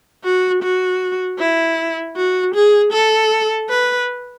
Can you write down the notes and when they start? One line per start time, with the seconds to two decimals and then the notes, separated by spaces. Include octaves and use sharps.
0.24 F#4
0.63 F#4
1.39 E4
2.17 F#4
2.55 G#4
2.93 A4
3.70 B4